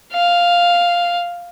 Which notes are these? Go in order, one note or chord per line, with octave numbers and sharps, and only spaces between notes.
F5